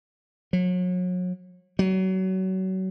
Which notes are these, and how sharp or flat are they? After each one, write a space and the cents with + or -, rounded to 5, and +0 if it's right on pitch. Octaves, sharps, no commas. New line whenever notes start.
F#3 -35
F#3 +30